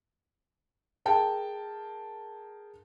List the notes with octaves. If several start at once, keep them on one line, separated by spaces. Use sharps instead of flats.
G#4 A#4 G5 A5